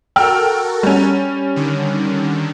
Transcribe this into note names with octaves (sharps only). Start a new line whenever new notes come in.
F#4 A4 A#4 G5 E6 F6
G3 C#4
D3 D#3